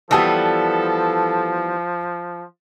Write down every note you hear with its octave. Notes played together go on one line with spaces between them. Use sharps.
E3 F3 G3 B3 A4 A5 D#6 E6